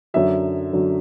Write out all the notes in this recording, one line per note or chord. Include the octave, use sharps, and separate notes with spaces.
F#2 D3 F#3 E5
F#2 D3 F#3